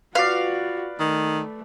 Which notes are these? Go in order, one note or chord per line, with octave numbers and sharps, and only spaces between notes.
F4 F#4 B4 D5 F5
D#3 A3